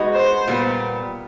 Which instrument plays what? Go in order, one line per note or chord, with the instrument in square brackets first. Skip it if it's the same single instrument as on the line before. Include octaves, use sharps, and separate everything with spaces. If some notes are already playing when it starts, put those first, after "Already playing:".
Already playing: [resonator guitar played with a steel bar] G#3 B3 D#4 F#4
[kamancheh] C5
[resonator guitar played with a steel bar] A#2 G3 B3